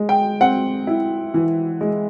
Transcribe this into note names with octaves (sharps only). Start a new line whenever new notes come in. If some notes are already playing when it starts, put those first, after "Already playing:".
Already playing: G#3
G5
C4 F#5
E4
E3
G#3